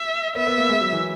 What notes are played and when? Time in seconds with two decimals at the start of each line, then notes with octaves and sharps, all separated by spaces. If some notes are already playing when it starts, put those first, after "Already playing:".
Already playing: E5
0.35 B3 E5
0.47 B3
0.58 A#3
0.69 G#3
0.81 F#3
0.93 E3